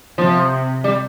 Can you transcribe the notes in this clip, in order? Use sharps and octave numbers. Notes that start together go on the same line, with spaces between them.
C3 F3
G3